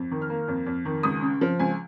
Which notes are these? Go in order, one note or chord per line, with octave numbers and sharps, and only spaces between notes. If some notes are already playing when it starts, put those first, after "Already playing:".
Already playing: F2
D#3
F6
A#3
F2
F2
D#3
C#2 D#6
C#3
F3
C#2 G#5